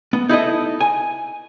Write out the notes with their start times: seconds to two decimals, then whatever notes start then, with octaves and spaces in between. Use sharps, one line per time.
0.13 B3
0.29 D#4 E4 A4 D#5
0.81 G#5